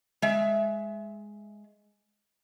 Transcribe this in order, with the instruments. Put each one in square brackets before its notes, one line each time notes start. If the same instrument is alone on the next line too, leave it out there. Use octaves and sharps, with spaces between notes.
[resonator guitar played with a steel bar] G#3 E5